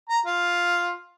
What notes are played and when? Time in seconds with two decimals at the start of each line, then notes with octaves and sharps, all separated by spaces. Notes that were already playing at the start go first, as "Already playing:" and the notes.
0.09 A#5
0.26 F4